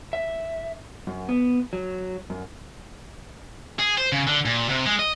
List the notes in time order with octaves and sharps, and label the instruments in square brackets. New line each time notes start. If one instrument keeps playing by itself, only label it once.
[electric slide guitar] E5
F#2
B3
F#3
F#2
[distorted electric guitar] G#4
C5
C#3
D3
A#2
C3
G#3
D#5